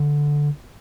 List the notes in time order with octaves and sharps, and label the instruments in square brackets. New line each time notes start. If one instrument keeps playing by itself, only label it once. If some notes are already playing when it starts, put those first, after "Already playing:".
Already playing: [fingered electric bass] D3